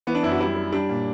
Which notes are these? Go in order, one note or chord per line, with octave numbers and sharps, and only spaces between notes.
E3 B3
D4
F#2 E4
F#4
G3 E4
G3
G3 D4
A#2